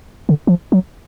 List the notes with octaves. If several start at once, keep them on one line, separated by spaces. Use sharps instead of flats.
D3
F3
F#3